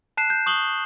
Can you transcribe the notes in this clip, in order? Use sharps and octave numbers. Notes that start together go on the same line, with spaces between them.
A5 F#6 C7 E7
G6
C#6 D#6 F#7 G7